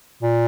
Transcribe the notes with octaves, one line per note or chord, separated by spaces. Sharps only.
A#2